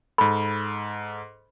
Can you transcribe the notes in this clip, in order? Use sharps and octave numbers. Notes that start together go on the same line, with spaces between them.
G#2 A4 B5